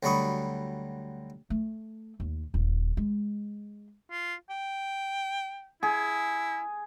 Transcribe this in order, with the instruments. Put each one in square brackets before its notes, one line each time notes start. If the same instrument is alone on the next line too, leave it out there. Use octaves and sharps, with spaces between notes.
[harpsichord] D2 F#3 G3 B5 C#6 D#6
[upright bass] A3
D#2
D#1
G#3
[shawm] F4
G5
[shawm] E4 [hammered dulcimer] G#4